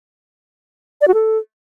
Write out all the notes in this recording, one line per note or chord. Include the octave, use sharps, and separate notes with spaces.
D5
F#4
A4